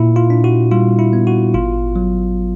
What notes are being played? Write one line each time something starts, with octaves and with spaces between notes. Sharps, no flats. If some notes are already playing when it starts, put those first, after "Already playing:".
Already playing: A#2 E4
F4
D4
F#4
G3 F4
E4
B3
F#4
G#1 F4
F#3